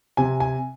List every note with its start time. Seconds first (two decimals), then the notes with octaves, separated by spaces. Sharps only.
0.17 C3 G#5
0.40 G#5